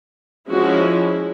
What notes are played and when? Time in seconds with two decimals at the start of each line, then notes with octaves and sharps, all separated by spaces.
0.49 F3 G#3 C#4 E4 F#4